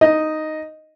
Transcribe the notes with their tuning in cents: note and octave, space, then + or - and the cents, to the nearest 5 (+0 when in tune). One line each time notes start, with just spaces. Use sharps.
D#4 +0 D#5 +0